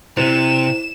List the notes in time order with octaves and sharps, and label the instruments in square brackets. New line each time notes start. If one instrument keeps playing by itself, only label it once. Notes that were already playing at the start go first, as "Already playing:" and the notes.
[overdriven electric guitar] C3 [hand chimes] E4 C5 [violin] E7